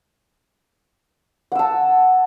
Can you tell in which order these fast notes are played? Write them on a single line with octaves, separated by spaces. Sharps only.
F#5 E6 A5